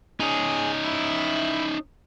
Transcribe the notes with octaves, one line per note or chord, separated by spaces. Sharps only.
C#4 D#4 G#4
E4